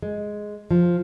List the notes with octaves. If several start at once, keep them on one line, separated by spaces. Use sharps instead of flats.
G#3
F3